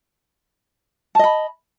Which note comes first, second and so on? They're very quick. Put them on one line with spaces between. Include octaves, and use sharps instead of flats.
A5 D#5 B5